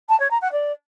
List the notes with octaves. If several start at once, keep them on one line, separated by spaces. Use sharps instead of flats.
A5
C#5
A#5
F#5
D5